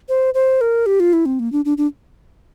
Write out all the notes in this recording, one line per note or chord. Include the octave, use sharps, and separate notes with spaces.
C5
C5
A#4
G4
F4
E4
C4
A#3
D4
D4
D4